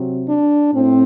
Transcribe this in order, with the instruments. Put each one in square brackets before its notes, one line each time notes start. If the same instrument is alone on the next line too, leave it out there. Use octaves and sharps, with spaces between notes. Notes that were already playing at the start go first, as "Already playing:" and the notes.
Already playing: [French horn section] C3 F#3 C4
D4
A2 C4